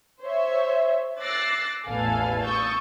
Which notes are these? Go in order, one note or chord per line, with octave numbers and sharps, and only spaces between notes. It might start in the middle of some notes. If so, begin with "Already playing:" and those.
C5 C#5 E5
D6 E6 F#6 A6 A#6 C7
A1 E2 A4 B4 F5 G#5
C#6 D#6 E6 G6 A6